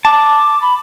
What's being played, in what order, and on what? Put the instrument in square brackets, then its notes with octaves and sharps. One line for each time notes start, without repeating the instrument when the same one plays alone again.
[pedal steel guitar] A5 [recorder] D6
[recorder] B5